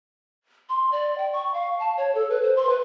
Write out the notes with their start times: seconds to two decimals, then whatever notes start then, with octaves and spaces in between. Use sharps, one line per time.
0.69 C6
0.92 D5
1.18 G5
1.33 C#6
1.54 F5
1.79 A5
1.97 C#5
2.15 A4
2.30 B4
2.43 C5
2.57 C6
2.69 B4